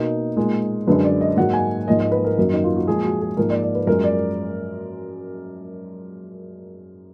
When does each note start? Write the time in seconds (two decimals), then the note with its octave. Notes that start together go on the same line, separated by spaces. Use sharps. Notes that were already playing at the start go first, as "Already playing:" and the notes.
Already playing: B2 A#3 D#4
0.37 A#2 G#3
0.87 F#2 D3 G#3 B4
1.04 D5
1.21 D#5
1.37 G#2 F#3 A#3 F#5
1.53 G#5
1.87 G#2 F3 A#3 D#5
1.99 D#5
2.12 B4
2.25 A#4
2.37 F#2 D#3 F#3 A#3
2.53 D#4
2.64 F4
2.76 F#4
2.88 A#2 F3 G#3 G#4
3.04 F#4
3.21 G#4
3.37 G#2 F3 A#3 A#4
3.50 D5
3.62 D5
3.75 B4
3.87 F#2 F3 G#3 A#4
4.04 D5